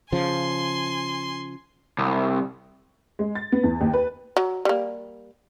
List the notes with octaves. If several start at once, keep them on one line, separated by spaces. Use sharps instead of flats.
C#3 F3 G#5 C6
C2
G#3
A6
B3
E2
D#2
B4
F#3
G3 A#3